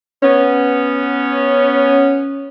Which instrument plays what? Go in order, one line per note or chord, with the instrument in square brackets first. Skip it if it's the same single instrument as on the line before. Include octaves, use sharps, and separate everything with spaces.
[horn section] B3 C#4